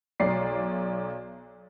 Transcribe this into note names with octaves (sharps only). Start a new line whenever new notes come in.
B1 D5 C7